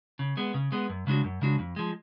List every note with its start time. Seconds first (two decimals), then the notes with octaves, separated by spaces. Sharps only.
0.19 C#3
0.37 G#3 B3
0.54 C#3
0.72 G#3 B3
0.89 F#2
1.07 C#3 G#3 D4 F#4
1.24 F#2
1.42 C#3 G#3 D4 F#4
1.59 F2
1.76 F3 G#3